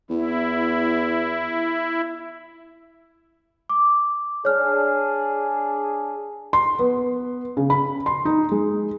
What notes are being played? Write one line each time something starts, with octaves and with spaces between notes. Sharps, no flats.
E2 E4
D6
D4 G#4 C#5 F6
C6
B3
C#3
B5
C6
D#4
G#3